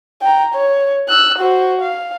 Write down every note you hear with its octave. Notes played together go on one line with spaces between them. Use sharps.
G5 A#5
C#5
E6 F#6
F#4 C5
F5